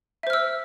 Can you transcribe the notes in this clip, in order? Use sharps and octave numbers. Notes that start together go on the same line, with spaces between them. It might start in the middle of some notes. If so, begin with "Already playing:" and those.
C5 E5 E6 F6